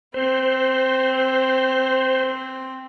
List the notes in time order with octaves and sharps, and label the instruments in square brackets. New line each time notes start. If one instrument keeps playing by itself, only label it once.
[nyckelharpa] C4 [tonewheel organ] C5